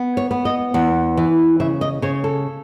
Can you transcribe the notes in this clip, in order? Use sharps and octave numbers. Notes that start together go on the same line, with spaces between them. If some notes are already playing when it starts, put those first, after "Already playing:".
Already playing: B3
C#5
B3
D#5
E2 F#5
E3
C#3 E5
D#5
C#3 C#5
A4